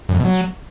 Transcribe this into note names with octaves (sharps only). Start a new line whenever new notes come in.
F#2
F2
B2
F#3